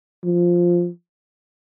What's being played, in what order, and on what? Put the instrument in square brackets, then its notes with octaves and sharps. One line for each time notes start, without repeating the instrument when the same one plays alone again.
[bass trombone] F3